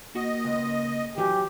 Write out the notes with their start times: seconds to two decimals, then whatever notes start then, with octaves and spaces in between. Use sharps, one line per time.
0.15 A#3 F#4 D#5
0.45 C#2
1.18 E3 F#3 G4